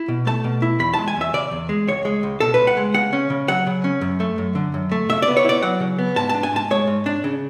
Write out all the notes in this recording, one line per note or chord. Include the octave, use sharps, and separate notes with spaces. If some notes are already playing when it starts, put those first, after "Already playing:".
Already playing: E4
B2
A3 A5
B2
E4
E2 B5
A5
G#3
G#5
E2 E5
C#3 D5
E2
G#3
C#2 C#5
G#3
C#2
B2 A4
C#2 B4
F#5
G#3
C#3 F#5
C#4
C#3
F#3 F#5
C#3
C#4
F#2
A3
F#2
D3
F#2
A3
C#3 E5
D5
B3
C#5
E4 D5
F#3 F#5
C#3
B3
G#2 A5
D4 A5
G#5
G#2 A5
G#3 C#5
G#2
D4
C#3